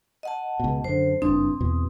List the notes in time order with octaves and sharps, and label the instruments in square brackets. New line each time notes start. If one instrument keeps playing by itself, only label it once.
[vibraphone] D#5 F#5 A5
[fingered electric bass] C#2 B2
[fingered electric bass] F#2 D3 [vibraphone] C5
[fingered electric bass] F#1 G2 D4 [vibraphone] C4 D#6
[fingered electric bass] E2 B2